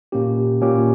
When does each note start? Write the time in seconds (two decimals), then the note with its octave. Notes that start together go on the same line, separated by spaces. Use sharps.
0.12 A#2 A#3 C#4 G4
0.61 A#2 A#3 C#4 G4